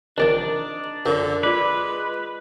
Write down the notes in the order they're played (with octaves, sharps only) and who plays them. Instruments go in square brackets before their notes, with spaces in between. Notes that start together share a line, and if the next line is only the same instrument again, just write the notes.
[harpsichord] C2 D#3 F3 [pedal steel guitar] D4 D5 [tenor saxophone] D#4
[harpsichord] F#2 F3 [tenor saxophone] D3
[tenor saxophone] G#3 [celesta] F4 D5 D6 [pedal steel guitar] B4